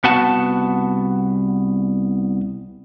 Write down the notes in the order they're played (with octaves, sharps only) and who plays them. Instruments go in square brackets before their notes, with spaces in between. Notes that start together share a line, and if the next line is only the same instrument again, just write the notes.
[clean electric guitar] C2 B3 F#4 F#5 A5